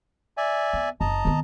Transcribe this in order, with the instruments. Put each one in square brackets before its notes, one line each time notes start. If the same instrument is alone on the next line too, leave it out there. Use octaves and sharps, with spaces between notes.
[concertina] D5 E5 G#5
[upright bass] B3
[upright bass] F#1 [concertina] D#5 A5 A#5
[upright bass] D#3 B3